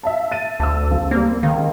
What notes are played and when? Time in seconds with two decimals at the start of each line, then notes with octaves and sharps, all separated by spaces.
0.03 E5 F5 A5
0.32 A6 D#7
0.60 D2 A5 E6
0.91 F#1 C#2
1.11 G3 A#3 C4
1.43 C#2 D#3